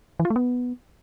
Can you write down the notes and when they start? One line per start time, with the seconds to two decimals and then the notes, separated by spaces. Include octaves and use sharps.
0.20 E3
0.25 F4
0.30 A3
0.36 B3